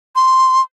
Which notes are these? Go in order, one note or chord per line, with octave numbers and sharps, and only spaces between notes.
C6